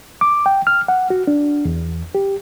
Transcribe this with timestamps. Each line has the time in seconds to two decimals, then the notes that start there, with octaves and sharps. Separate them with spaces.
0.21 D6
0.46 G5
0.67 F6
0.88 F#5
1.10 F#4
1.27 D4
1.65 E2
2.15 G4